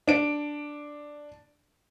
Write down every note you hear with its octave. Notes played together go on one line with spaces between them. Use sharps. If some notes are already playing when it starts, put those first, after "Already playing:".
D4 D7